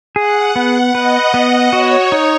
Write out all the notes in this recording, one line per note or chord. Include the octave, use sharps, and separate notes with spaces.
G#4 F#5
B3
B4 D#5
B3
F#4 C#5
D#4